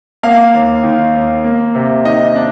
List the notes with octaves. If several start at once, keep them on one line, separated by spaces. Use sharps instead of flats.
A#3 F5
D#2
D#3
D#2
A#3
C3
D#3 D#5
D4